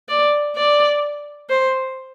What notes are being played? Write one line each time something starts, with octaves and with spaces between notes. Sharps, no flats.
D5
D5
C5